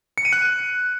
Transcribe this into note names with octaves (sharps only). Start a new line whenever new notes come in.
C#7
D#7
F#6